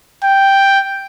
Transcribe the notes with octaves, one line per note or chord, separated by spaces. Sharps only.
G5